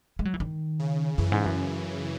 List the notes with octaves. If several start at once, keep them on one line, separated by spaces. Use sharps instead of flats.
G#3
F#3
E3
D#3
C#3
F#2 C#3 E3
G#2
F#2